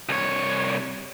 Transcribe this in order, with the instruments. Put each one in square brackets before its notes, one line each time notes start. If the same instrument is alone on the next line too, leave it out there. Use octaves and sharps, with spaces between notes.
[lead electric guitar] C2 C#5